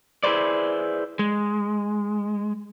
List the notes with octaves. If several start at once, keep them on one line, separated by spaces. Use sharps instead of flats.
E4 G#4 B4 C5 D5
G#3